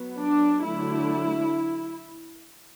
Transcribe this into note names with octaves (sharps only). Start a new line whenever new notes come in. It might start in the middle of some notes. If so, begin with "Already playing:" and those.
Already playing: F#3 B3
D4
D3 F#3 A3 E4